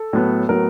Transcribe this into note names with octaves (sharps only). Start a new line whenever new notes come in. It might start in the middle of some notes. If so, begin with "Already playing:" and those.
Already playing: A4
A2 F#3 B3
A2 F#3 B3 A#4